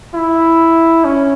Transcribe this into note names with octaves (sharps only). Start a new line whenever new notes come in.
E4
C#4